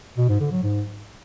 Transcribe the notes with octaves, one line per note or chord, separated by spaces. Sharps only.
B2
G#2
D3
F#3
G#2